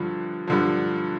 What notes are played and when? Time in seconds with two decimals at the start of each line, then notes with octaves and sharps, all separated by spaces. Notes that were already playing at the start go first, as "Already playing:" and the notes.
Already playing: G2 D3 F3
0.48 G2 D3 F3